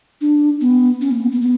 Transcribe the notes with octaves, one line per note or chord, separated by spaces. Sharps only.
D4
B3
C#4
A#3
B3
B3
B3